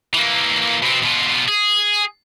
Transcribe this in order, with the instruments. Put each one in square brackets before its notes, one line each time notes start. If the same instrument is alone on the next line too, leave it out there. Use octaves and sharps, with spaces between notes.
[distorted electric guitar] E3 A#3
B2 C4
B2 F4
G#4